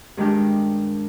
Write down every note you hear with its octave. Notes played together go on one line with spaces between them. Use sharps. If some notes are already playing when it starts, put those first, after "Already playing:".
G2 D#3 G#3 D4 G4